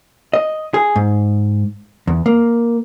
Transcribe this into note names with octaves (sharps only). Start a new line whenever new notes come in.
D#5
G#4
G#2
E2
A#3